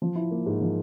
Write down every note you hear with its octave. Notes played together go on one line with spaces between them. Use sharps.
F3
E4
A#3
G#2
F3